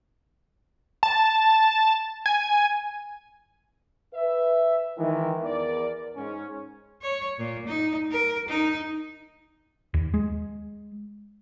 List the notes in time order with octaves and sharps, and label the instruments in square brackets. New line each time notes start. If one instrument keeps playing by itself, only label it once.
[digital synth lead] A5
G#5
[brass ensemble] B4 E5
D#3 E3 G#3
E2 A#4 D5
G#2 C#4
[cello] C#5
A#2
D#4
A#4
D#4
[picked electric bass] D#2
G#3